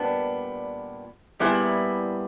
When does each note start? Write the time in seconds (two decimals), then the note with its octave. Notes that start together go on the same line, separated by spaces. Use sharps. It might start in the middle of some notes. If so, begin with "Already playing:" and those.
Already playing: A#2 G3 B3 D4
1.39 A#2 G3 B3 E4 G#4